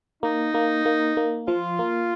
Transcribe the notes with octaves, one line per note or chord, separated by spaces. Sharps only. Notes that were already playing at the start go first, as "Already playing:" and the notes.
A#3 D#4
A#3
A#3
A#3
F3 F4
A#3